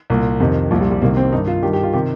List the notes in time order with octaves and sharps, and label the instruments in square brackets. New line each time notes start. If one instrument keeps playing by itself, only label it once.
[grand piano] C2 A#2
F2 C3 D#3
C2 A#2 F3
G3
G3
C2 C3 D#3 A#3
C4
G2 D#3 D#4
F4
G2 D#3 G4
G4
F4
C3 D#3 G4